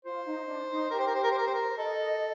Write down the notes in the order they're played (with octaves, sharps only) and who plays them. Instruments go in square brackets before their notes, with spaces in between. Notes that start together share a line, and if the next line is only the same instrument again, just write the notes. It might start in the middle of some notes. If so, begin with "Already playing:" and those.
[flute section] F4 [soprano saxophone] C5
[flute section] D#4
D4
D#4
[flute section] G4 [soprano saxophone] A#4
[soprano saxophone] C5
A#4
C5
A#4
C5
A#4
C5
A#4
[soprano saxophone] A4 [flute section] D#5